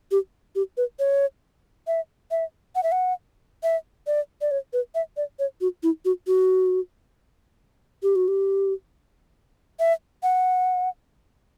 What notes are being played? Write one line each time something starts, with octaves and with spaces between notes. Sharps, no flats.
G4
G4
B4
C#5
E5
E5
F#5
E5
F#5
E5
D5
D5
C#5
B4
E5
D5
C#5
F#4
E4
F#4
F#4
G4
F#4
G4
E5
F#5